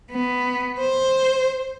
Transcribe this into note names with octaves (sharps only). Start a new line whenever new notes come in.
B3
C5